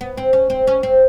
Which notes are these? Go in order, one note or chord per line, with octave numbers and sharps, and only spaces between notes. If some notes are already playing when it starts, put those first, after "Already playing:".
B3
C4
C#4
C4
C#4
C4